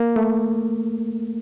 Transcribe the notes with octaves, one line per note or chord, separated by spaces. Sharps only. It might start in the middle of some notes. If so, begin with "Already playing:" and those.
Already playing: A#3
A3